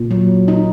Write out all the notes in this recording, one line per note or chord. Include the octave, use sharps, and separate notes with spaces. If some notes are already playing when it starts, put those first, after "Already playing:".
Already playing: A#2
F#3
D#4